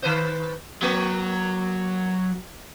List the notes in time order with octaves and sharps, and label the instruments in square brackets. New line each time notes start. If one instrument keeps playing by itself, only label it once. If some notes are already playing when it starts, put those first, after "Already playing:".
[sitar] D#3 B4 C5
[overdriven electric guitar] F#3 [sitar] A#3